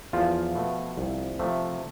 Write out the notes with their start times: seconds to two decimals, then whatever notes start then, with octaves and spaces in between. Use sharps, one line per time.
0.13 E2 F3 F4
0.55 B2 A3
0.98 C2
1.39 C3 F3 A3